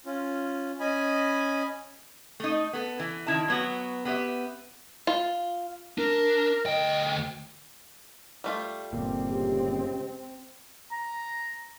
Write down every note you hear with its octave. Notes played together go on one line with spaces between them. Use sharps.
C#4 F4
C#4 D#5 G#5 B5
A3 D#4
B3 A4
E3
D#3 E4 A5
F#3 B3 F#4
B3 G4 C5 E5
F4
D4 A#4
D2 D#5 G5
G3 A3 F4
G1 A#2 C4
C#3 G#3 G4
A#5